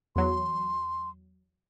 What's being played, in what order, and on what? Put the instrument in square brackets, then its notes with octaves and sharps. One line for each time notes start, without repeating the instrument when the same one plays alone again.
[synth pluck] E2 F#3 [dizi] C6